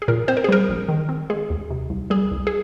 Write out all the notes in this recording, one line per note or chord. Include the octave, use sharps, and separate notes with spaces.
G#4
A#2 A#4
C4 C5
A#4
G#4
G3 A#4
A#1
D#3
C4
G#3 G#4
D#2
C3
C2
G3 G#4
C2
G#4